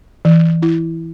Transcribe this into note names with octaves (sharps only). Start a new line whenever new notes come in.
E3
E4